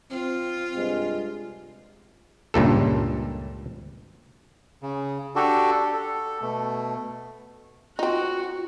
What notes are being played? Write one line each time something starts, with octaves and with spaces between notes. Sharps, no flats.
C4 F4
G2 C3 G#3
C#2 G2 A#2 A4
C#3
D4 F#4 G4 A4
A4
B2 A3
C4 D#4 F4 F#4